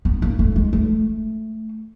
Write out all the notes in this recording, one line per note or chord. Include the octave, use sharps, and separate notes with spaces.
B3
A#3
A3
G#3
A3